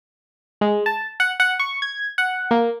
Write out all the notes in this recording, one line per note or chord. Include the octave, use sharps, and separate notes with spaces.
G#3
A5
F#5
F#5
C#6
G#6
F#5
A#3